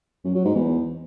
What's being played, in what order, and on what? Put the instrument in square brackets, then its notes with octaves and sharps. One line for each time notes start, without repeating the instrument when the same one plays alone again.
[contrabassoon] F#2
F#3
G#2
E2